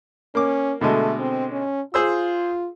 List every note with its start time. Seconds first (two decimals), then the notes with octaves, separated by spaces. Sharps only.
0.35 A#3 C#4 D6
0.81 B2 D3 G#3 A3
1.20 C4
1.51 C#4
1.94 F4 G#4 C5 E6